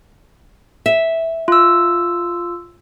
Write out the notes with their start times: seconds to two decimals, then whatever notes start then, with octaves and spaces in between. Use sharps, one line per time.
0.86 E5
1.48 F4 E6